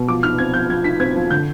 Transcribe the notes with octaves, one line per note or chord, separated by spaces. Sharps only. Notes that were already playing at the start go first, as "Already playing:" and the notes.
Already playing: B2
F3 D6
D#4 F6
C4 G#6
F3 G6
F3 G#6
D#4 B6
C4 G#6
F3
D3 G6